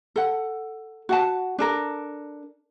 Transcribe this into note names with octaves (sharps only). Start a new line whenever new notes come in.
A4 F#5
F#4 F#5 A5
D4 A4 A#4